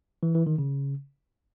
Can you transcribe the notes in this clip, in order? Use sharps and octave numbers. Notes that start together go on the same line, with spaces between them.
E3
E3
D#3
C#3